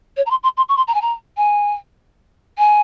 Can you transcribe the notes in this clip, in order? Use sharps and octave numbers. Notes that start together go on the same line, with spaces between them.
C#5
A#5
C6
C6
C6
C#6
C6
A#5
G#5
A#5
G#5
G#5